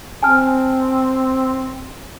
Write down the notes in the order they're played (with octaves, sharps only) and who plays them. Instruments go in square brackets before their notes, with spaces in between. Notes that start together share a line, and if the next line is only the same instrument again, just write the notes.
[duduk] C4 [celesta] G#5 A5 F6